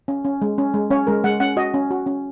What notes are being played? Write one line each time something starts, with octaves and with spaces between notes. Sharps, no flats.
C#4
C#4
G#3
C#4
G#3
C#4 C#5
G#3 A#4
G#3 F#5
C#4 F#5
F#4 D#5
C#4
F#4
C#4